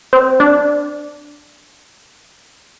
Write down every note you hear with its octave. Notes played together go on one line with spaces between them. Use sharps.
C4
D4